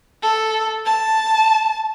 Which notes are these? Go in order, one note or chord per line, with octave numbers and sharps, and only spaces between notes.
A4
A5